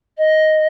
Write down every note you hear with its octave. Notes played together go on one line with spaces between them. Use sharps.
D#5